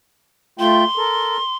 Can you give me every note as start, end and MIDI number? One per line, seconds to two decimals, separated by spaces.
0.59 0.84 57
0.59 0.84 65
0.59 0.84 79
0.59 1.57 84
0.97 1.37 69
0.97 1.37 70